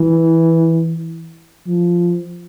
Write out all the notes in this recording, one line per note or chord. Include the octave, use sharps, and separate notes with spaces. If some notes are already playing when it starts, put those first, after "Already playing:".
Already playing: E3
F3